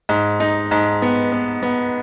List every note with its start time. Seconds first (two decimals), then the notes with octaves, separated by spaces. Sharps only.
0.09 G#2
0.40 D#4
0.71 G#2
1.02 B3
1.32 B3
1.63 B3